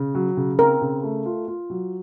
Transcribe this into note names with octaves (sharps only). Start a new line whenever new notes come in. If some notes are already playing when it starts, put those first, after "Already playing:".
Already playing: C#3
F#3
C#3
C4 A#4
C#3
A3
F4
F4
F#3